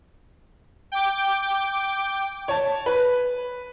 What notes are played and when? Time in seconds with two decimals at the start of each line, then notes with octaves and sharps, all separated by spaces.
0.92 G5 D6
2.48 C#5 A5
2.86 B4